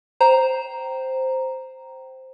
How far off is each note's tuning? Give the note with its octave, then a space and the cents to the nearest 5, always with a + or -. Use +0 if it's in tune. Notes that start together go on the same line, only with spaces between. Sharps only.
C5 +0 G5 -20 A#5 +0